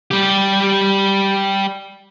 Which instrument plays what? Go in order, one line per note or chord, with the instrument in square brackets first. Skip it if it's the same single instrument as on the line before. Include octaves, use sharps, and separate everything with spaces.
[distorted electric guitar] G3 G4